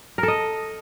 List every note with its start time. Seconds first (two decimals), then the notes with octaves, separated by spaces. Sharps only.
0.18 A#4
0.23 A4
0.28 D#5